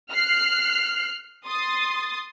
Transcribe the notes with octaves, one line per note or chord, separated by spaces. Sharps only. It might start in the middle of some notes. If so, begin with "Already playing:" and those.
F6 F#6 C7
C6 D#6 A6